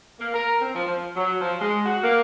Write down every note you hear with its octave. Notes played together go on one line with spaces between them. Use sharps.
A#3
A#4
C4
F3
F3
F#3
F3
G#3
F#4
A#3